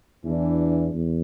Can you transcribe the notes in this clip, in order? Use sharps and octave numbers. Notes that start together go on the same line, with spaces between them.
E2 E3 D4
E2